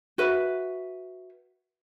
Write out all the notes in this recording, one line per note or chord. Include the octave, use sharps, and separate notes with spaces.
F#4 B4 E5